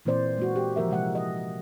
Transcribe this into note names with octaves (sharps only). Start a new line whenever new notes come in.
A#2 E3 A#3 C4 C5 D5
G#3 A#3 F#4
G4
E3 F3 A#3 A#4 E5
C3 E3 G#3 F#5
D#5